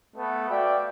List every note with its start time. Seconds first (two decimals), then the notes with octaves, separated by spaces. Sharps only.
0.17 A3 B3
0.50 F#4 D5 E5 F5 G5